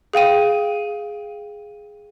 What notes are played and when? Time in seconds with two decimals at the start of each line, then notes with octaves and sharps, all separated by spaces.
0.13 G#4 F5 G5 D#7